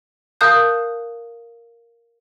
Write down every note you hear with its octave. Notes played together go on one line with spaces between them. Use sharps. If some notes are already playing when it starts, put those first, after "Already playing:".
A#4 F5 A5 D#6 F#6 G6